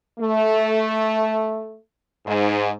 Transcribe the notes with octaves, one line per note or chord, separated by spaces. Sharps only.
A3
G#2